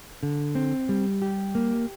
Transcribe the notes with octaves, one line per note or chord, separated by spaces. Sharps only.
D3
C4
G3
G4
A#3